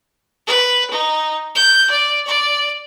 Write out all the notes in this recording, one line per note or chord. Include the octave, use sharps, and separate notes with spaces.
B4
D#4
G6
D5
D5